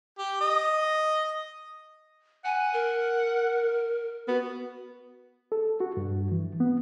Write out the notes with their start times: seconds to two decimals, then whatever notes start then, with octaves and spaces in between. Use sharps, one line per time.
0.18 G4
0.41 D#5
2.45 F#5 G#5
2.73 A#4
4.28 B3 F#4
5.52 A4
5.80 F#4
5.97 G2
6.32 E3
6.60 B3